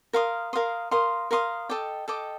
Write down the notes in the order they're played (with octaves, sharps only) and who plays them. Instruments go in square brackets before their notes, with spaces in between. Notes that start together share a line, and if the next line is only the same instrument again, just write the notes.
[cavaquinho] A#4 F5 C6 D#6
A#4 F5 C6 D#6
A#4 F5 C6 D#6
A#4 F5 C6 D#6
A4 D#5 G5 D6
A4 D#5 G5 D6